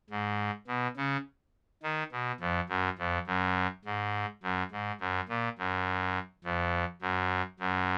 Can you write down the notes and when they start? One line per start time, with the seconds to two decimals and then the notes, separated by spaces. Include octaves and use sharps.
0.10 G#2
0.67 B2
0.97 C#3
1.83 D#3
2.12 B2
2.40 F2
2.69 F#2
2.99 F2
3.27 F#2
3.85 G#2
4.43 F#2
4.71 G#2
5.00 F#2
5.29 A#2
5.58 F#2
6.44 F2
7.02 F#2
7.60 F#2